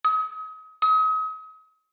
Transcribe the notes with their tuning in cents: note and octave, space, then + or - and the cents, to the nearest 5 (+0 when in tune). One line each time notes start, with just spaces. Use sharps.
D#6 +35
D#6 +40